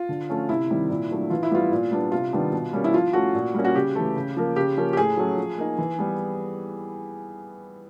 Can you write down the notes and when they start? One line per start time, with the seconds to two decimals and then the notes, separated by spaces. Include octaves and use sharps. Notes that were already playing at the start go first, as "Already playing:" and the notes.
Already playing: F4
0.09 D3
0.29 F3 A3 C#4
0.49 C3 E4
0.70 D#3 G3 C4
0.90 A#2
1.11 F#3 A3 D4
1.30 E3 F4
1.43 E4
1.51 G3 B3 F4
1.72 A#2
1.91 G3 B3 D4
2.12 C3 F4
2.32 D#3 G3 B3 D4
2.53 B2
2.73 G3 A#3 C#4
2.84 E4
2.94 F3 F4
3.13 A3 C#4 F#4
3.34 A#2
3.54 G3 A#3 C#4
3.65 F#4
3.75 C#3 G4
3.95 E3 A3
4.16 C#3
4.37 F3 A#3
4.56 C#3 G4
4.77 F3 A#3 C#4
4.93 G4
4.96 A2 G#4
5.17 F#3 A3 C#4
5.37 F3
5.58 A#3 D#4
5.78 E3
5.99 G3 B3